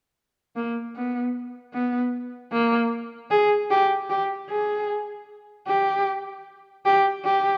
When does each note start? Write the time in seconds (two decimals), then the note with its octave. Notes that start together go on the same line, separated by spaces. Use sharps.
0.56 A#3
0.96 B3
1.74 B3
2.52 A#3
3.31 G#4
3.70 G4
4.10 G4
4.50 G#4
5.67 G4
6.85 G4
7.25 G4